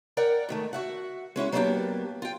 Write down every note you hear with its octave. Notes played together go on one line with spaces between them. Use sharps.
A#4 D5 F#5 G5
G#2 D#3 A3
F#4 E5 F#5
G#3 C#4 E4 F#4
F#3 G3 A#3 B3 D4 G4
F4 G5